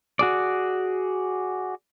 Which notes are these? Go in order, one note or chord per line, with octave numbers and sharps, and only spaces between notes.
F#4 G#4 D5